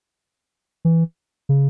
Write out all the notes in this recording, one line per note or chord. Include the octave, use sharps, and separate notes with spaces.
E3
C#3